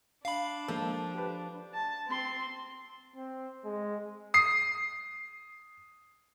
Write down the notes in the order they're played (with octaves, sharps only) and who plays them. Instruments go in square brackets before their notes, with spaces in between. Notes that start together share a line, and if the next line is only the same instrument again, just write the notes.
[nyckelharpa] D4 [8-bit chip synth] F5 B5
[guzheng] F3 [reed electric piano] G#3 A#3 A4
[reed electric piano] G4 B4
[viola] A5
C4 C6
[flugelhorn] C4
G#3
[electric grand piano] D#6 C7